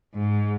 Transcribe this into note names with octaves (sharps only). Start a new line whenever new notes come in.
G#2